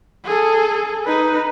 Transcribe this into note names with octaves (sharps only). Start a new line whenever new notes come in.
G#4 A4
D#4 B4